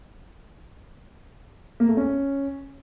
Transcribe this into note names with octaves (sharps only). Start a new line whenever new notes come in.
A#3
A3
C#4